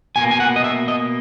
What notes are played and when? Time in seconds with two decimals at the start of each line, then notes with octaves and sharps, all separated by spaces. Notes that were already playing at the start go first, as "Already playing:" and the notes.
0.16 B2 A#3 G#5
0.31 G#5
0.40 F#5
0.56 D#5
0.64 E5
0.88 D#5